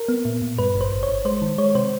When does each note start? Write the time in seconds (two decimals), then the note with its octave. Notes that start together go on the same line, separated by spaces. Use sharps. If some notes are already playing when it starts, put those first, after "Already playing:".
Already playing: A#4
0.08 B3
0.25 A#2
0.42 A#2
0.58 G2 B4
0.75 G#1
0.81 C5
0.92 G#1
1.03 C#5
1.08 G#1
1.25 G#3 C5
1.42 D#3
1.58 G#3 C#5
1.75 C3 C5